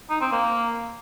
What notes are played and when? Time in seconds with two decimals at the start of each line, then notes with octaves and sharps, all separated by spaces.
0.10 D#4
0.21 C4
0.32 A#3